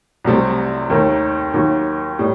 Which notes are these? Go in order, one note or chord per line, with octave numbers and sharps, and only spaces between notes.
C2 C3 F#3 A3 C4
D#2 D#3 A3
D#2 D#3 F#3
A2 G3